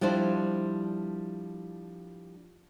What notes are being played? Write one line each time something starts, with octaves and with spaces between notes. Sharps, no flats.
F3 G3 D4 E4 C5